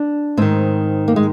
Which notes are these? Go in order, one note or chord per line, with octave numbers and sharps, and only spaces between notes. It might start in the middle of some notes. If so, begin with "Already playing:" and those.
Already playing: D4
G#2 D#3 C4
A#3
G#3